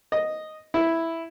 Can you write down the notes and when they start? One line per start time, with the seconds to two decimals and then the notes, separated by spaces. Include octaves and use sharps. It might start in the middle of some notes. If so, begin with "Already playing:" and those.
0.12 D#5
0.74 E4